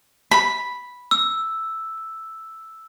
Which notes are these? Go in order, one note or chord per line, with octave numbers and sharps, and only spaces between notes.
B5
E6